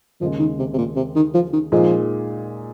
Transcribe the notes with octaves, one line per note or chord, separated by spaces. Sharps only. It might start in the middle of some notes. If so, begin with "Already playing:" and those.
D#2 C#3 F3 G#3
D#3
C3
C3
A#2
C3
D#3
F3
D#3
A#2 F3 G#3 D#4 G#4